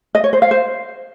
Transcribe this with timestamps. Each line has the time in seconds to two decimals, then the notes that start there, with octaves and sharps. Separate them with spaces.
0.15 D#5
0.24 C#5
0.33 C5
0.42 F5
0.51 C5